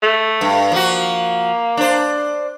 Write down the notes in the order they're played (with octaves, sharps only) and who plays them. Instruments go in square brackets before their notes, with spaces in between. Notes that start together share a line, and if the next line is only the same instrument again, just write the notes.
[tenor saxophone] A3
[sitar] G2
[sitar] F3 F#4 [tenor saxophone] A#3
[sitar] D4 C5